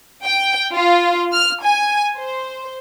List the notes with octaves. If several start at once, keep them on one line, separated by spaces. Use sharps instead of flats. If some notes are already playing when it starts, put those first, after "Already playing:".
G5
F4
F6
G#5
C5